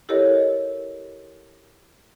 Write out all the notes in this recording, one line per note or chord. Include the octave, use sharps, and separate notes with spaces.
E4 G4 A4 A#4 C#5 D#5